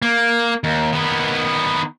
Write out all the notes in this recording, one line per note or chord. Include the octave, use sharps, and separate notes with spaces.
A#3
D#2
D#3 B3